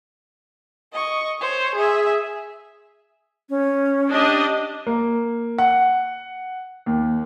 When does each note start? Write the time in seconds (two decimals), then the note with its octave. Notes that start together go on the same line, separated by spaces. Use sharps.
0.92 D#5 C#6
1.40 C5 C#5
1.75 G#4 E5
3.50 C#4
4.09 D4 G4 D#5
4.87 A#3
5.58 F#5
6.86 D#2